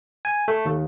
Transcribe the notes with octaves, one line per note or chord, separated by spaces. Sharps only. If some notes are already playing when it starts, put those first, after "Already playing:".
G#5
A3
D#2